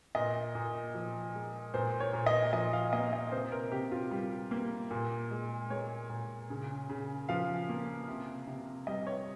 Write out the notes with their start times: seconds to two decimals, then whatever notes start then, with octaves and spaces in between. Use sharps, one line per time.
0.15 A#2 D#5
0.55 A#2
0.95 F3
1.34 G#3
1.74 A#2 C5
2.00 C#5
2.13 A#2
2.26 D#5
2.53 F3 D#5
2.73 F5
2.93 A#3 D#5
3.13 D#5
3.32 C3 C5
3.52 A#4
3.72 C3 G4
3.92 F4
4.11 G3
4.51 A#3
4.91 A#2
5.31 G#3
5.70 G#3 C#5
6.10 A#2
6.50 C#3
6.89 C#3
7.29 F3 F5
7.69 A#3
8.08 C3
8.48 C3
8.87 G3 D#5
9.07 C#5